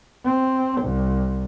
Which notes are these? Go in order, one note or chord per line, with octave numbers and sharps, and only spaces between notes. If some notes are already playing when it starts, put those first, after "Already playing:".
C4
C2